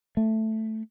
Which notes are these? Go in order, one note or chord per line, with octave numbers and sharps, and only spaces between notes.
A3